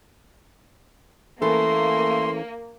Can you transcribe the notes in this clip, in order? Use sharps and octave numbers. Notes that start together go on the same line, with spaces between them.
E3 A3 A#3 C#4 A4 C6